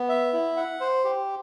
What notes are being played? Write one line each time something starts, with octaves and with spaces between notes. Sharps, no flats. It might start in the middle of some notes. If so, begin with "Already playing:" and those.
Already playing: B3
E5
E4
F#5
C5
G4